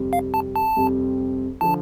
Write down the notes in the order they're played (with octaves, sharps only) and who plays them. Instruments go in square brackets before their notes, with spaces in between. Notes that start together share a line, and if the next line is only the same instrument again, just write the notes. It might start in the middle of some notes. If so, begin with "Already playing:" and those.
Already playing: [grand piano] F2 C3 G3 C4
[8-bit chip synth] F5
A5
A5
[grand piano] F2 C3 G3 C4
[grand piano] D3 F3 [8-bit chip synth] A5